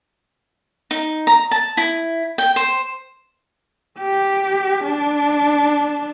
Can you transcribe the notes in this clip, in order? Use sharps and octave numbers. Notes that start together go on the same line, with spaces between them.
D#4
A#5
A5
E4
G5
C5
G4
D4